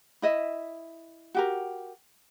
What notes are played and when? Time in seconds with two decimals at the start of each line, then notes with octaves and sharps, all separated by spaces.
0.22 E4 D#5 E5
1.35 F#4 G4 A#4